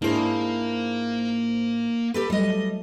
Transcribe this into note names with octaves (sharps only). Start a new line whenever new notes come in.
G#2 A#3 D4 E4 G#4 C5
G4 A4 B4
F#3 G3 A3 D#5